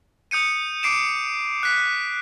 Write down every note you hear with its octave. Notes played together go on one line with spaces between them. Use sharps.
D#6 G6 C#7 D#7
D6 C7 D7 E7
F#6 B6